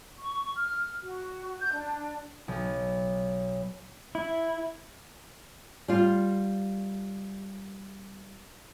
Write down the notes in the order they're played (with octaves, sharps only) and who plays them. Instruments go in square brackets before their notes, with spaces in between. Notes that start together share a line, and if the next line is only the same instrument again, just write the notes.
[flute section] C#6
F6
F#4
G6
D4
[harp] B1
[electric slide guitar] E4
[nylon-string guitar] G3 F4